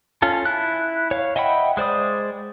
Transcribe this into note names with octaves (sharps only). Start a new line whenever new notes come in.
C#4 F4 A4
E4 F#6
C#5 F5
D#5 E5 F#5 G5 B5
G#3 C5 D5 D#6